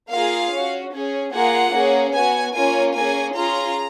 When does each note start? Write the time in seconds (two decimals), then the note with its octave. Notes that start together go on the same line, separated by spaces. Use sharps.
0.10 A#3 F4 G#4 F5
0.51 C#4 F#4
0.93 C#4 G#4
1.32 A#3 F4 G#4 F#5
1.74 A#3 C#4 G#4
2.14 B3 F#4 G#5
2.54 A#3 C#4 F4 G#5
2.95 A#3 C#4 G#4 G#5
3.36 C#4 F4 G#4 A#5